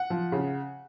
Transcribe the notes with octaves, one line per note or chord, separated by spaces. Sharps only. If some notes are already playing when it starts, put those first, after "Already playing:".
Already playing: F#5
F3
C#3